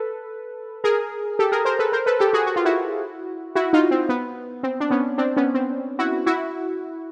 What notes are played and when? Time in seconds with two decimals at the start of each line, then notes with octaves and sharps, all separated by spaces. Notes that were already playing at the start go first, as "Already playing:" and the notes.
Already playing: A4 B4
0.84 G#4 A#4
1.39 G4 A4
1.52 G#4 A#4
1.65 A#4 C5
1.79 A4 B4
1.92 A#4 C5
2.06 A4 B4
2.19 G4 A4
2.33 F#4 G#4
2.46 F#4
2.56 F4
2.65 E4 F#4
3.56 E4 F#4
3.73 D#4 F4
3.91 C4
4.09 B3
4.63 C4
4.80 D4
4.90 B3 C#4
5.18 C4 D4
5.37 B3 C#4
5.54 C4
5.99 E4 F#4
6.26 E4 F#4